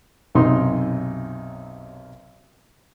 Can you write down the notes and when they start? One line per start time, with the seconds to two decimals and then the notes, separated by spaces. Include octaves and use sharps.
0.35 B1 F#2 C3 D#4 C6